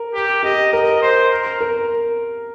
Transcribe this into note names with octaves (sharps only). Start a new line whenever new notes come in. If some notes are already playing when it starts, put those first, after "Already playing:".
Already playing: A#4
G4
G4 D#5
A#4 D#5
C5
A#4
A#4